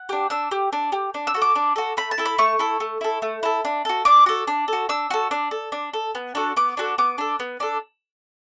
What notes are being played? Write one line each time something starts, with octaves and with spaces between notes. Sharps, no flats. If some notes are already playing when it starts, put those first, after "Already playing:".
Already playing: F#5
D4 G4
D4 E6
G4
D4
G4
D4
E6
F#4 A4
D6
D4
F#4 A4
A3 B5
A5
E4 A4
B5
A3 C#6
E4 A4
A3
E4 A4
A3
E4 A4
D4
F#4 A4
D4 D6
F#4 A4
D4
F#4 A4
D4 E6
F#4 A4
D4
A4
D4
A4
B3
D4 F#4 A4
B3 D6
D4 F#4 A4
B3 D6
D4 A4
B3
D4 A4